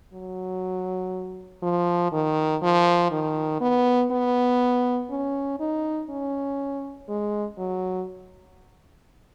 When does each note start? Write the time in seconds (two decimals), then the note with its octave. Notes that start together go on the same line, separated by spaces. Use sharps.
0.13 F#3
1.63 F3
2.12 D#3
2.62 F3
3.11 D#3
3.61 B3
4.11 B3
5.10 C#4
5.60 D#4
6.10 C#4
7.09 G#3
7.58 F#3